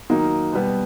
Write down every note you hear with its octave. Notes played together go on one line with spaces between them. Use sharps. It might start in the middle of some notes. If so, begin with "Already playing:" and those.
D#3 F#3 A#3 D#4
B2 G3 B3